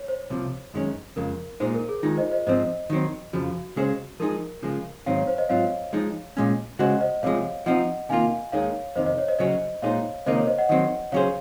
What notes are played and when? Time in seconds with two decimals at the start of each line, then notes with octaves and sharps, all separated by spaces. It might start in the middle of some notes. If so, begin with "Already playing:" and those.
Already playing: C#5
0.08 C5
0.30 C2 C3 F3
0.74 F#2 D#3 G#3 C#4
1.16 F2 C#3 G#3 A#4
1.60 A#2 G#3 D#4 C5
1.75 A#4
1.89 G#4
2.03 D#3 G#3 D#4 F4
2.18 C5 D#5
2.32 C5 D#5
2.47 G#2 F3 C4 C5 D#5
2.90 D#3 F#3 C4
3.33 F2 C#3 F3 F#4
3.76 C#3 G#3 C#4 G#4 C5
4.20 F3 G#3 D#4 G#4 A#4
4.62 C#3 F3 G#3
5.06 G#2 D#3 F#3 C4 D#4 C#5 F5
5.18 C#5
5.27 C5
5.38 C5 D#5
5.49 G#2 F#3 C4 F4 C#5 F5
5.93 F3 G#3 D#4
6.37 A#2 G#3 C#4
6.79 C#3 G#3 C#4 F#4 C5 D#5 F#5
7.01 C5 D#5
7.23 C2 C3 F3 G#3 C#5 F5
7.66 F3 C4 D#4 D#5 F#5
8.09 C3 D#3 A#3 F4 F5 G#5
8.52 D#2 D#3 G#3 D#4 G#4 C#5 F5
8.96 F2 C3 D#3 C5 D#5
9.06 C5 D#5
9.18 C#5
9.28 C5 D#5
9.39 C#3 F#3 C#4 F#4 C5 D#5
9.82 A#2 G#3 D#4 G#4 C5 C#5 F5
10.26 C#2 C3 D#3 A#3 D#4 C5 D#5
10.37 C#5
10.47 C5 D#5
10.58 D#5 F#5
10.69 D#3 F#3 C4 D#5 F#5
11.12 C#3 F#3 C#4 G#4 C5 C#5 F5